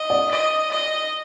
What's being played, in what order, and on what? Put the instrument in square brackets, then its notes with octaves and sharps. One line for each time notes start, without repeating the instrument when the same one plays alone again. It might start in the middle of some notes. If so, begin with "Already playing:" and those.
Already playing: [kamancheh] D#5
[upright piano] D5
[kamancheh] D#5
D#5